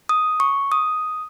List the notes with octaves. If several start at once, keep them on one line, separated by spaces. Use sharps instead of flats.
D#6
C#6
D#6